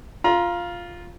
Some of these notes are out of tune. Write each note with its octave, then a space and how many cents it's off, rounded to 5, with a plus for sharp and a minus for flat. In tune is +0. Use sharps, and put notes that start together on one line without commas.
F4 +0 A#5 +30